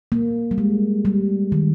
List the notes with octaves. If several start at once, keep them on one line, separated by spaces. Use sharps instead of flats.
A#3
G3
G#3
G3
D#3